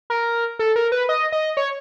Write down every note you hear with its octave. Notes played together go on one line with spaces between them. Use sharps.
A#4
A4
A#4
B4
D#5
D#5
C#5